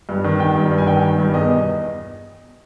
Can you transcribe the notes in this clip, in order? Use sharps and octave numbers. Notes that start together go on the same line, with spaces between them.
G2
D#3
D#3 G5
G2
G2
G#5
D#3 G5
D#3
G2
E2 D#5
B2